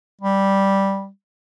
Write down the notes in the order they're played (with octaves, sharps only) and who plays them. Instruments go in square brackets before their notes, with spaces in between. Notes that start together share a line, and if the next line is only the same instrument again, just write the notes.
[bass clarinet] G3